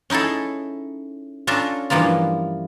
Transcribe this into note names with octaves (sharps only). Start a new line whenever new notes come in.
C#4 D#4 E4 G#4 A4
C#4 D4 F4 A4 A#5
G2 E3 F3 A#3 F4